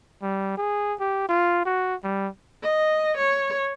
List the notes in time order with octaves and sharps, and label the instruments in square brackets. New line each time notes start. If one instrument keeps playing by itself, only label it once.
[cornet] G3
G#4
G4
F4
F#4
G3
[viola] D#5
C#5